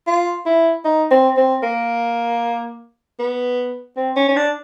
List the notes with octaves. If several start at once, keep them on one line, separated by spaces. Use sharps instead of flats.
F4
E4
D#4
C4
C4
A#3
B3
C4
C#4
C#4
D4